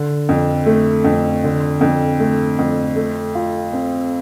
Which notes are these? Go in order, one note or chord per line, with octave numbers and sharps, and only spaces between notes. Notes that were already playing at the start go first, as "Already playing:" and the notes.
Already playing: D3
F2
A3
F2
D3
F2
A3
F2
A3
F4
C4